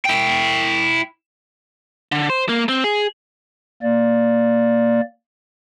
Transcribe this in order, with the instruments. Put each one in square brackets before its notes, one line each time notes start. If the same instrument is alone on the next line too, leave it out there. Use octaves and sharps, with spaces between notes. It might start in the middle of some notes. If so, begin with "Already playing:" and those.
[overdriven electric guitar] E4 G5
[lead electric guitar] D3
C5
A#3
C4
G#4
[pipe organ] A#3 D5